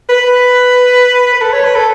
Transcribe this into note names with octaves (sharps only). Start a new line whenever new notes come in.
B4
B4
A4
C#5
B4
A4